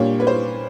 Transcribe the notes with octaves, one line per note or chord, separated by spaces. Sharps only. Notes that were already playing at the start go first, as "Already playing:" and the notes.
Already playing: A#2 G3 A#3 D4 C#5
B4
C5